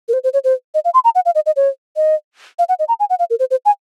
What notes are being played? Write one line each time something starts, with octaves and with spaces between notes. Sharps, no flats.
A#4
C5
C5
C#5
C5
D#5
F5
C6
A#5
F#5
F5
D#5
D#5
C#5
D#5
F5
F#5
D#5
A#5
G#5
F#5
F5
A#4
C5
C5
G#5